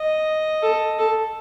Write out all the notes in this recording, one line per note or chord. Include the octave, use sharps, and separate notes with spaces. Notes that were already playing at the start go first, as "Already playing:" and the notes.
Already playing: D#5
A4
A4